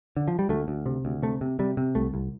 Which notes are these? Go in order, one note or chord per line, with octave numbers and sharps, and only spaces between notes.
D3
F3
G3
D2 A3
D2
C3
D2
C3 A3
C3
C3 G3
C3
C2 A3
C2